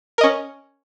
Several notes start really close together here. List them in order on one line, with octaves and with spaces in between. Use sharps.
A#4 D#5 C#4